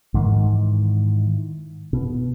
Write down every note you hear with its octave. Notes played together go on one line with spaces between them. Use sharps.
G#2 D#3 E3
B2